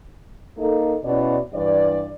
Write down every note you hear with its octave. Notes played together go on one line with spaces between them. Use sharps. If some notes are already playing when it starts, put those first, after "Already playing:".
A#3 D#4 A4
B2 C#4 E4 D5
G2 E3 D5